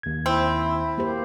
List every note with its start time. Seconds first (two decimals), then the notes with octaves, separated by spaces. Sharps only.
0.03 D#2 G#6
0.26 C4 E4
0.98 A#3 G4 C5